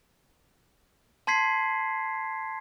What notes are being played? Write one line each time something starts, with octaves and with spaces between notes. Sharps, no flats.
A5 C6 G#6 B6 C7